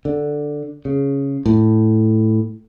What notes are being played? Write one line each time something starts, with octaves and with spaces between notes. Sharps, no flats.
D3
C#3
A2